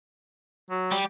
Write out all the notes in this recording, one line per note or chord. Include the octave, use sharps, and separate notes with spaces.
F#3
G3 G4